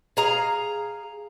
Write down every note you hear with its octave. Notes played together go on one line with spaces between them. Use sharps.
G#4 F5 A#5